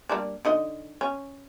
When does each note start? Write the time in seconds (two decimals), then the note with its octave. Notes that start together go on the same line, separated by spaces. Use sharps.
0.09 G3 A#3 D4
0.45 D3 D#4 D#5
1.01 C#4